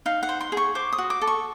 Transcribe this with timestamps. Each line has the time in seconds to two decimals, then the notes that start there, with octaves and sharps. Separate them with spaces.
0.06 D#4 F5
0.23 F#5
0.29 C5
0.41 C6
0.52 G#4
0.57 C#6
0.75 C5 D6
0.93 D#6
0.98 F#4
1.10 D6
1.21 A4
1.27 C#6